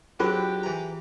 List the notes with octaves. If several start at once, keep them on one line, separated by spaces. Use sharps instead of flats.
F#3 C4 D4 F4 G4 G#4 A#4
E3 A#5